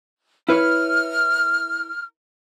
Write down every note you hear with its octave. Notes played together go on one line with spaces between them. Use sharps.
E4 B4 C#5 F6